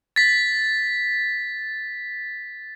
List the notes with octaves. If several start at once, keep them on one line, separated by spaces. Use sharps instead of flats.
A6 B6